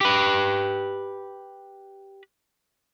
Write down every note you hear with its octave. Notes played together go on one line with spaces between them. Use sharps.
G4 B4